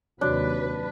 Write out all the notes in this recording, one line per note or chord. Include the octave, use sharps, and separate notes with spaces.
D#2 C3 F#3 D4 F#4 B4 C#5